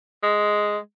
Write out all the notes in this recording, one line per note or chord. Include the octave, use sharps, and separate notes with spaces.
G#3